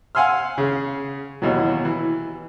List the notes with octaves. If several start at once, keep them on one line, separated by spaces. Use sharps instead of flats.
F5 F#5 G#5 C6 E6 F6
C#3
D#2 B2 E3 F#3
E3